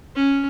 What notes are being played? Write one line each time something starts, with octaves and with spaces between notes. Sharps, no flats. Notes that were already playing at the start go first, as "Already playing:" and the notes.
C#4